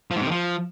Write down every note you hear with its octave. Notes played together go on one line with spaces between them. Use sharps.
F3
G#2
C3
D#3
F3